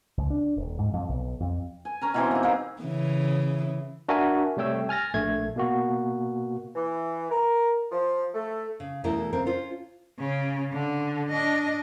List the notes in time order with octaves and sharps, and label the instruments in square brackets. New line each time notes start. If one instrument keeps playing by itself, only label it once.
[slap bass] C#2
D4
D#1
G#2
F2
B1
F2
[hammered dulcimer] G#5
C#4 A#4 A#5
B2 E3 C4
A#3 D#4
A#3 G#4
[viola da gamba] C#3 E3
[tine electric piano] D4 F#4 A#4 E5 G#5
C3 G3 A3 C#5 G5 E6
G#5 F6 A6 A#6
A#1 A3 G#6
B2 A#3 F#4
[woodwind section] E3
A#4
F3
A3
[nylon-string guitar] C#3
E2 B2 A3 E4 A#4
C#3 C4 A#4
C#4 F4 C5
[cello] C#3
D3
D4 D#5